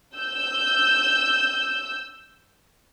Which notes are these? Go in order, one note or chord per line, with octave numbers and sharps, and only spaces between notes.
E6 G6